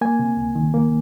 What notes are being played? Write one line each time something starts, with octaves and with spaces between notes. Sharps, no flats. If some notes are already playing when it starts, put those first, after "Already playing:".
A#3 G#5
C3
C#2
D#3
A#3